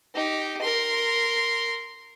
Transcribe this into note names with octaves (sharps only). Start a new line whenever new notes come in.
D#4 G4
A#4 C6